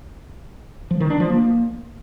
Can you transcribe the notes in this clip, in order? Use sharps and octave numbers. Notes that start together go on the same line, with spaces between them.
F3
D#3
D4
F3
A#3